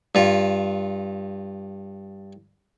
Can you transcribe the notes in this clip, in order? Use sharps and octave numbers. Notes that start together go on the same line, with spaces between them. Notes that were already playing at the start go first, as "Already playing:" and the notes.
G2 F4